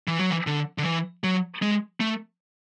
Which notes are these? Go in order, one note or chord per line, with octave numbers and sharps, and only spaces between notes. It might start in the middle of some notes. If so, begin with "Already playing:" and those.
E3
F#3
E3
D3
D3
E3
F#3
G#3
A3